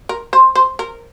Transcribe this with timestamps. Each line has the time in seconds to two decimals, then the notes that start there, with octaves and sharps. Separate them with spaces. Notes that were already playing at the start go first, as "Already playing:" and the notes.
0.09 A#4
0.33 C5
0.55 C5
0.79 A#4